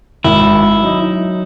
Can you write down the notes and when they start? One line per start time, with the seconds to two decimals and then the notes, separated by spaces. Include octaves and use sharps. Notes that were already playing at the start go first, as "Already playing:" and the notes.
0.24 G#1 E4
0.81 F#3 D#4